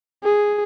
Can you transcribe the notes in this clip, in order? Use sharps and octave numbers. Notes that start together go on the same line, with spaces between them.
G#4